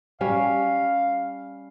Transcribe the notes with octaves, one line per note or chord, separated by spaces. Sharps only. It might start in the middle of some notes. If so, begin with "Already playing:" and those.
G3 C#4 F5